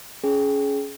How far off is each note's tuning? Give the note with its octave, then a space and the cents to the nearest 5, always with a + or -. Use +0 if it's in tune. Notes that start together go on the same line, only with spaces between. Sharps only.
C#4 +15 G#4 +20 G5 +0